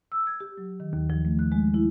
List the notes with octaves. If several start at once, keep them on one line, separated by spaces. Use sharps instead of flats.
E6
G#6
G4
F#3
D#3
D#2
F3
A3
F#6
G#3
E4